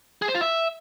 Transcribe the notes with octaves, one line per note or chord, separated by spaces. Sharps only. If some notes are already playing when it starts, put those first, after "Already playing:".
G#4
C5
F4
E5